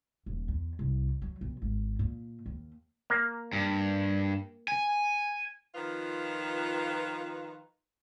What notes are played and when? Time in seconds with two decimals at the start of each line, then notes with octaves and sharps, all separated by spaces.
0.26 D#1
0.48 E2
0.79 C2
1.22 F#3
1.41 B1
1.62 G#1
1.99 A#2
2.46 D#2
3.10 A#3
3.53 G2
4.68 G#5
5.74 D#3 F3 F4 B4